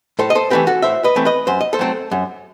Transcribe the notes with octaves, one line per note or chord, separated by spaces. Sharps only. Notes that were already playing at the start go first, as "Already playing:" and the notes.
A2 A4 C5
D#5
A4 C5
E3 A3 C4 G4 B4
F#4 A4
A2 C5 E5
B4 D#5
E3 A3 C4
B4 D#5
F#2 C5
D#5
A4 C5
F#3 A3 C4
F#2